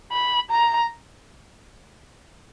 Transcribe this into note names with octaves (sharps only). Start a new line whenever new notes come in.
B5
A#5